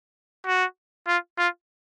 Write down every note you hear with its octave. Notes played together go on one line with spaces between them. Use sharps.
F#4
F4
F4